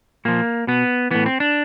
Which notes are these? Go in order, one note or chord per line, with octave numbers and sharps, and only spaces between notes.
A#2 F3 A#3
B2 B3
A2 E3 B3
C4
D4